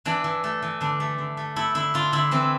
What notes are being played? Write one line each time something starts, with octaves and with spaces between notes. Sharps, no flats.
E3 D4
E3
A3
E3
D3 D4
A3
D3
A3
A3 E4
D3 E4
D3 F4
D3 E4
E3 C4